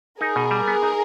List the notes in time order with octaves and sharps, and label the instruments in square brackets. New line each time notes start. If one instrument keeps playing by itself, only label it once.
[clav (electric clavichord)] D#4 [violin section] G#4 A#4
[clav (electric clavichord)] B2
G3
B3
D#4